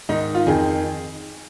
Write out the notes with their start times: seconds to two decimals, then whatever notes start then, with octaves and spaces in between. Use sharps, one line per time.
0.09 G#2 D#3 D#4
0.35 F4
0.47 F2 D#3 G#4